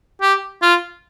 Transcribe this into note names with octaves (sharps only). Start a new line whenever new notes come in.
G4
F4